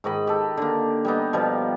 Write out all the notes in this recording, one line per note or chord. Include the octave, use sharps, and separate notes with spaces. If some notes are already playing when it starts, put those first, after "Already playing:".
G#2 D#3 D#5 B5
G4 A4
D3 A#3
G3 B3 D#4
B2 F3 G3